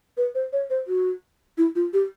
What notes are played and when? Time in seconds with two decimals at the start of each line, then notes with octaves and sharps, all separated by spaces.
0.17 B4
0.35 C5
0.53 C#5
0.70 C5
0.88 F#4
1.58 E4
1.76 F4
1.93 G4